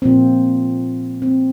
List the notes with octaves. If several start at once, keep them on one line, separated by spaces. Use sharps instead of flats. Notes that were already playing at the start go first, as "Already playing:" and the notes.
A#2 F3 A#3 C4
C4